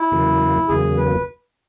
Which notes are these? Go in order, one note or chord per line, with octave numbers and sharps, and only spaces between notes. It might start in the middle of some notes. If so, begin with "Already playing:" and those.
Already playing: E4
E2 C#3 F#3 A#3
E2 C#3 F#3 A#3 G#4
B4